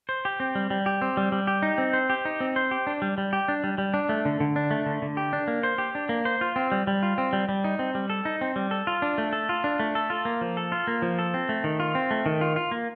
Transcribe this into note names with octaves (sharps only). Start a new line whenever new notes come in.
C5
G4
C4
G3
G3
G4
C4
G3
G3
G4
D#4
C4
C5
G4
D#4
C4
C5
G4
D4
G3
G3
G4
D4
G3
G3
D4
A3
D3
D3
D4
A3
D3
D3
G4
D4
A#3
C5
G4
D4
A#3
C5
F4
C4
G3
G3
F4
C4
G3
G3
D#4
C4
G3
A4
D#4
C4
G3
A4
F4
D4
A3
A4
F4
D4
A3
A4
F4
A#3
F3
A4
F4
A#3
F3
A4
C4
A3
D#3
F4
C4
A3
D#3
F4
F4
A#3